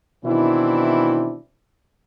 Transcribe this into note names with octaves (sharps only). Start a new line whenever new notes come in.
B2 D#3 E3 C4 D4 E4